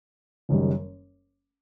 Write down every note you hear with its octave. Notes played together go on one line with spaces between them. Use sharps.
F#1 F#2 D#3 G3